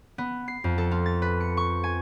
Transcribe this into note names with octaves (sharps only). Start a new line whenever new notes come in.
B3
C7
F2
A4
F4
A6
B4
C#7
C#6
G#5